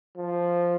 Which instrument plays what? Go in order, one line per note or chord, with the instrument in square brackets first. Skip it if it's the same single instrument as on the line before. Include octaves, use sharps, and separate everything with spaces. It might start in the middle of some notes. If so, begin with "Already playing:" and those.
[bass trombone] F3